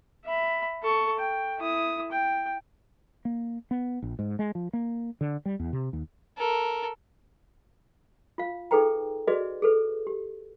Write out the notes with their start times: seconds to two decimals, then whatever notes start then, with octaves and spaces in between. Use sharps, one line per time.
0.25 E5 B5
0.83 A4 C#6
1.19 G5
1.59 E4 D#6
2.12 G5
3.25 A#3
3.71 B3
4.02 A#1
4.19 G#2
4.39 G#3
4.55 F3
4.73 A#3
5.21 D3
5.45 G3
5.59 E2
5.73 C3
5.93 D#2
6.37 A4 A#4
8.38 F4 F5
8.71 D#4 G#4 A4 B4 G5 A#5
9.27 F#4 G#4 B4 D5 D#5
9.62 G#4 A4 B4
10.07 G4